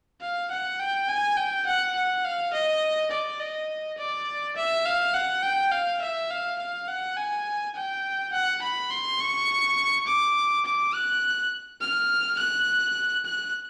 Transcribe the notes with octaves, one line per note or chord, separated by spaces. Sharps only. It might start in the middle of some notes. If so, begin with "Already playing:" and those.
F5
F#5
G5
G#5
G5
F#5
F#5
F5
D#5
D5
D#5
D5
E5
F5
F#5
G5
F5
E5
F5
F5
F#5
G#5
G5
F#5
B5
C6
C#6
D6
D6
F#6
F6
F#6
F#6